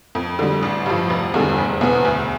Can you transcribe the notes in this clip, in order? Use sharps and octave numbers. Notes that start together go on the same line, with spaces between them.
F2
D3 G3
A1
G2 F3
F1
E2 D3 G3
F1
E2 B2 B3
D2